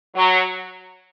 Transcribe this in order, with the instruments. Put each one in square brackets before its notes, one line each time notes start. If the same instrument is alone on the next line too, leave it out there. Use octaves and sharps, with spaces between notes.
[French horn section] F#3